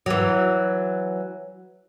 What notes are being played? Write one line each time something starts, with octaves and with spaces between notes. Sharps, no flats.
E3 F#3